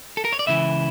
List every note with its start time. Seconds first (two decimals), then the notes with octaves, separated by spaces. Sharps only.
0.17 A4
0.25 A#4
0.32 C#5
0.39 D5
0.47 C#2 C#3 E3 E4 E5